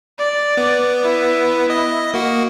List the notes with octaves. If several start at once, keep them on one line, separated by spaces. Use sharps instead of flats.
D5
B3
E4
D#5
A#3 F#4